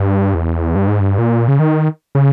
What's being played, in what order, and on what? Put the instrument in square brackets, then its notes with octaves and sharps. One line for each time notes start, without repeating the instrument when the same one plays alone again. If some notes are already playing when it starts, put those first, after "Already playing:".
Already playing: [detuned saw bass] G2
E2
G2
G#2
G2
A#2
C#3
D#3
C#3